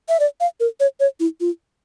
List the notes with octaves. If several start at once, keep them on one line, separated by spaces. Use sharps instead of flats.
E5
D5
F5
A#4
C#5
C#5
E4
F4